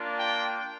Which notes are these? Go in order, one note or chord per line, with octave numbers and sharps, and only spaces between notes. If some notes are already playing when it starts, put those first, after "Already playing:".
Already playing: A#3 D4 F4
G5